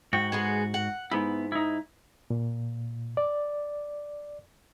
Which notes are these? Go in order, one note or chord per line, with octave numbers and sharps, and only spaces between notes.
G#2 F#4 G5
G#3 B3 G#4
F#5
G#2 B3 E4
D#4 E4
A#2
D5